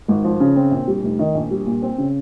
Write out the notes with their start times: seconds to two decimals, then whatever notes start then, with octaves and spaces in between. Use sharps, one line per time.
0.08 G#1
0.24 F3
0.40 C#3
0.56 C4
0.71 A#1
0.88 G3
1.03 F1
1.19 D#3
1.35 A#1
1.51 G3
1.67 A#2
1.82 C4
1.98 C#3